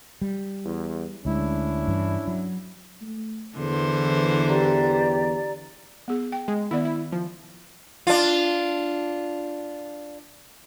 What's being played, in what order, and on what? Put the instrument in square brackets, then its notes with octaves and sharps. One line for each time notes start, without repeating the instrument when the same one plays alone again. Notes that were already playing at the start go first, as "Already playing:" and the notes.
[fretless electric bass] G3
[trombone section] E2
[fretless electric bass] D2 G#3 [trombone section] C#4 D4 E4
[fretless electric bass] G2 E3
F#3
[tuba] A3
[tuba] E2 [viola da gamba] D3 E3 C5
[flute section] G4 D5 A#5
[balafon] B3 G#4
G5
[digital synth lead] G#3
[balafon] D#3 B3 D5 [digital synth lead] E4
[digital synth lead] E4
F3
[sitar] D4 F4